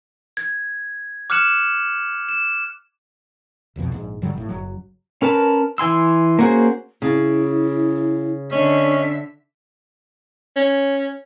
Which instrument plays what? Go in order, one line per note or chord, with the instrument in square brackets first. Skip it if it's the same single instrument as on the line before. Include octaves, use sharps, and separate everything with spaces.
[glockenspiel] G#6
D6 F6 F#6 C#7 E7 F#7
E7
[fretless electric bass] D#1 C2 F2 B2
A#1 G#2
G2 D3 F#3 G3
G#1 A2
F#1 F#3
[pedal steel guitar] C#4 A#4 B4 A5
E3 G#5 C6 E6
A#3 C#4 F#4 G#4 C5
[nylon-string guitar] C#3 [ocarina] E4
[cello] D3 E5 [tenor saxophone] C#4 [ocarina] D#5
[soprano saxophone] C#4